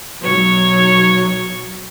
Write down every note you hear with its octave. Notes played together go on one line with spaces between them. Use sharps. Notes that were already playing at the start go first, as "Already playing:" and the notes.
B1 F#3 C#5